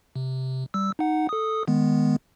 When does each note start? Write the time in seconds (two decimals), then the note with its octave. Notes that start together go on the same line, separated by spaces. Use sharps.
0.16 C3
0.74 G3 E6
0.99 D#4 F#5
1.29 A4 D#6
1.68 D#3 G#3 B3